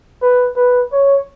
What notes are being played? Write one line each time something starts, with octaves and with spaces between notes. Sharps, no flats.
B4
B4
C#5